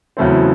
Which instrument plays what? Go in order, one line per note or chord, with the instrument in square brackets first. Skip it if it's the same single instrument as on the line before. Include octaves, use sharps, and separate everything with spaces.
[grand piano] E2 C#3 F#3 A3 C4